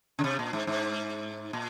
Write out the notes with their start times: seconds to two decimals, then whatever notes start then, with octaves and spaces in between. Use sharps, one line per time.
0.19 C#3
0.24 C3
0.39 A#2
0.53 G#2
0.67 G#2
1.53 A#2